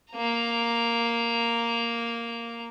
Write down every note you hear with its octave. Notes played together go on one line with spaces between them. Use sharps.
A#3 A#5